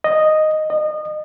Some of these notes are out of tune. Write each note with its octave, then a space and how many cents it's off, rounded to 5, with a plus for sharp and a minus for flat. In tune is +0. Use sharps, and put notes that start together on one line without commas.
D#5 -5
D#5 -30